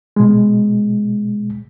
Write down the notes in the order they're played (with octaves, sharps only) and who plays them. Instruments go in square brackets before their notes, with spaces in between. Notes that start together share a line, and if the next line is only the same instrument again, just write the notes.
[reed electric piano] B2 G#3